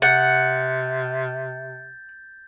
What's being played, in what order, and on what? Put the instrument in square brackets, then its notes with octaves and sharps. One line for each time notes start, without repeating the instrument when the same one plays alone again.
[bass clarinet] C3 [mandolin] F#5 [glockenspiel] G6 A6